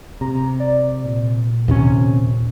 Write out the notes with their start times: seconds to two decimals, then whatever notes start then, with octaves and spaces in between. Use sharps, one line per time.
0.21 C3 A#5
0.60 D5
1.04 A#2
1.68 D#2 C3 C#4